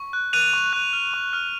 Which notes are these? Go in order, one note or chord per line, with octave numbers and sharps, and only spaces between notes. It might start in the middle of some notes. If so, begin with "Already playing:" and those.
Already playing: C#6
F#6
F#6 D#7 F7
C#6
F#6
F6
C#6
F6